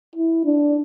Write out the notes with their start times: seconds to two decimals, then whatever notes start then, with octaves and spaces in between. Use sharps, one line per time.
0.15 E4
0.44 D4